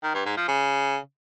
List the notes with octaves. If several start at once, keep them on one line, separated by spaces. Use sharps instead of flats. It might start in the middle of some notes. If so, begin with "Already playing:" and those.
D#3
G2
G#2
F3
C#3